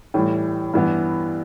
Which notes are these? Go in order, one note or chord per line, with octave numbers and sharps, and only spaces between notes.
A2 E3 G3
G2 E3 B3